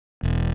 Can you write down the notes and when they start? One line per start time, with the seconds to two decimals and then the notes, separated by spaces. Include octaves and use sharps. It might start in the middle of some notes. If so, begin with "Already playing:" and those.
0.23 E1